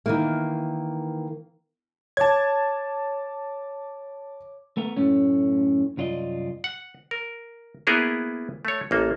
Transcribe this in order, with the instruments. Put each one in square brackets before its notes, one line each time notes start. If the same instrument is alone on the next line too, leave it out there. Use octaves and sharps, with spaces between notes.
[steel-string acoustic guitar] D#3 E3 A#3
[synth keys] C#5 D6 [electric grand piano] A5 G#6
[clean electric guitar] A3 B3 A#4
F#2 A2 A3 C#4
C2 F#2 F4 D5 D#5
[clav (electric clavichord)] F#5
A#4
A#3 B3 E4 G#4 A#4 B4
A3 C#5
A1 A#3 A4